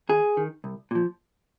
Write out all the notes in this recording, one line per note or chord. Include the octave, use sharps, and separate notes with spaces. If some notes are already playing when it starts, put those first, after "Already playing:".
D#2 G#4
D#3
C2
A#2 F3